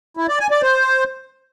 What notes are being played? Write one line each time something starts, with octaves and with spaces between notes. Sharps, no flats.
E4
D5
G#5
D5
C5